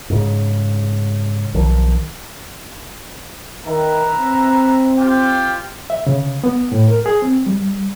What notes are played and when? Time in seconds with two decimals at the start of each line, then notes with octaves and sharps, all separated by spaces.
0.10 G#2 C#3
1.54 B1 D#3 F3
3.66 D#3 B4 E5 A#5
4.20 C4
4.98 F4 G4 G5
5.90 E5
6.07 C#3
6.44 B3
6.72 A2
6.88 A#4
7.06 G#4
7.22 C4
7.46 G3